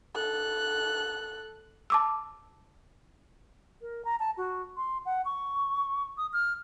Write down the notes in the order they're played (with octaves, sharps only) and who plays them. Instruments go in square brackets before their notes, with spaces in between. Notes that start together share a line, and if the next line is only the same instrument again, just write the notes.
[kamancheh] A4 F#6
[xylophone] A5 D6 E6
[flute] A#4
A#5
A5
F#4
C6
F#5
C#6
D#6
F6